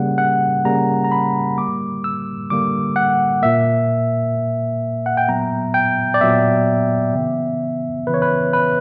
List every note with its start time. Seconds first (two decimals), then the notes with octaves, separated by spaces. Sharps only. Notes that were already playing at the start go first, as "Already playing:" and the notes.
Already playing: C#3 G3 A#3 F#5
0.18 F#5
0.65 C#3 G3 A#3 A#5
1.04 A#5
1.12 B5
1.57 D3 G3 A#3 D6
2.04 E6
2.50 D3 G3 A#3 D6
2.96 F#5
3.42 A#2 A#3 E5
4.35 A#2 A#3
5.06 F#5
5.17 G5
5.28 A#2 F#3 B3 A#5
5.74 G5
6.14 D5
6.21 A#2 F#3 B3 E5
7.14 C#3 E3 B3
8.07 C#3 E3 B3 B4
8.14 C#5
8.22 B4
8.53 B4